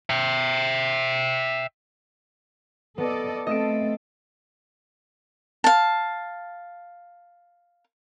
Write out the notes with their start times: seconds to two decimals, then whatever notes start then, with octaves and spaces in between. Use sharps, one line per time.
0.10 E5 G5
2.98 B3 A4 D5 D#5
3.47 A3 C4 A4 D#5 E5 D7
5.64 F5 A5